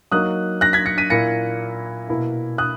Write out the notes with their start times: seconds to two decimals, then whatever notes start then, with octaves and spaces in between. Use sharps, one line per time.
0.12 F#3 A#3 D#4 D#6 F#6
0.61 F#6 A#6
0.73 G#6 B6
0.86 A#6 C#7
0.98 B6 D#7
1.10 A#2 A#3 E4 A#6 C#7
2.09 B2 A#3 E4
2.58 D#6 F#6